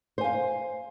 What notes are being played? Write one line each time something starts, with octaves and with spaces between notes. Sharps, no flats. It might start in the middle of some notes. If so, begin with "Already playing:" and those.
C5 F5 G#5